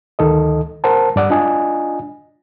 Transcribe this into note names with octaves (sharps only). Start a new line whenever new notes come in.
D2 D#3 A4 D#5
A#4 C5 F#5 A5
G2 D5 F#5
D4 F4 D#5 G#5